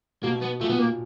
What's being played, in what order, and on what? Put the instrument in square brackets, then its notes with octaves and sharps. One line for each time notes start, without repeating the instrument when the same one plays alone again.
[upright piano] B2 [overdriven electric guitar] A#3
[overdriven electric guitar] B3
[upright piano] A#2 [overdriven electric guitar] A3
[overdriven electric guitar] B3
A#3